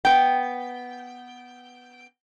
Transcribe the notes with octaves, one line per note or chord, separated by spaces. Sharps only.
B3 G5